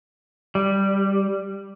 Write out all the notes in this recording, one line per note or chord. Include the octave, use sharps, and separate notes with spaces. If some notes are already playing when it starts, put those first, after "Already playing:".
G3